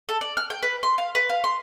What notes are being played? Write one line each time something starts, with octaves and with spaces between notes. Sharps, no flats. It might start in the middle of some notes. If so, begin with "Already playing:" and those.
A4
D5
F6
G5
B4
C6
F5
B4
F5
C6